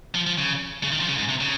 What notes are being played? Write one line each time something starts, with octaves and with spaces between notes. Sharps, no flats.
F3
F3
C#3
C#3
D#3
F3
C#3
G#2
C3
C#3